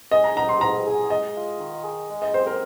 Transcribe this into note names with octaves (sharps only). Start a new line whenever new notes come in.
G#3 D#5
A#5
D#4 A#5
C6
G#2 A#5
G#4
G#3 D#5
F4
D#3
G#4
G#3
D#5
C4 C5
A#4